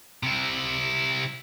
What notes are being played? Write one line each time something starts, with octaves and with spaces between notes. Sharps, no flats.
C3 E4